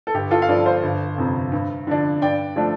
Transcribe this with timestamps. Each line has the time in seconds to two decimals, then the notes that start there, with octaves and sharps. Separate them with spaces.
0.07 A4
0.14 G1 G4
0.31 F4 A4
0.42 F5
0.48 G2 F3 A4 D5
0.66 C5 F5
0.83 G1
1.18 F2 C3
1.52 G2
1.87 D3 F3 D4
2.21 G2 D5 G5
2.56 F3 A3 D4